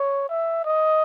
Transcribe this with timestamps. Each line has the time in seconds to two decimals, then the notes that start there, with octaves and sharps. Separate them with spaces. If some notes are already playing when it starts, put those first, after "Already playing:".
Already playing: C#5
0.29 E5
0.65 D#5